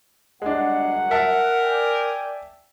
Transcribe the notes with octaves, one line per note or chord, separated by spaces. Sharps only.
G1 F#2 G#3 D4 F#5
A#4 E5 A5
D5 G5 G#5